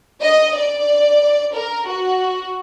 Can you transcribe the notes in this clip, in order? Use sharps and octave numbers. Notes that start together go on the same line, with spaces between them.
D#5
D5
A#4
F#4